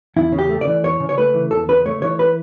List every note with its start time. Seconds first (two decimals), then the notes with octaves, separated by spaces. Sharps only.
0.16 E2 E4
0.32 C#3
0.39 G4
0.49 A3
0.61 D5
0.67 E3
0.84 E2 C#5
1.00 C#3
1.09 C#5
1.18 A3 B4
1.34 E3
1.51 E2 A4
1.68 C#3 B4
1.86 A3 C#5
2.02 E3 C#5
2.19 B4